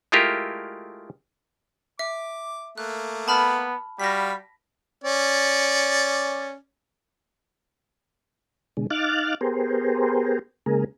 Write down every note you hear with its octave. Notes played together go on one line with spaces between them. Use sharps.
G#3 A3 E4 F4 G4 A#4
E5 D6
A3 A#3 F#6
B3 A5 B5 F6
G3 F#4 F5 B5 A#6 B6
C#4 D5
B2 D3 G#3
D#4 F5 D6 F6 F#6 A6
B3 G4 G#4 A#4 C5
C#3 G#3 A#3 G#4 A#4